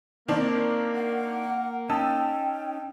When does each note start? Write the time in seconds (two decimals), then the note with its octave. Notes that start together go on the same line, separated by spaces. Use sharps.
0.28 D#3 A#3 C4 D4
0.95 F#5
1.90 C#4 D#4 G5 A5 E6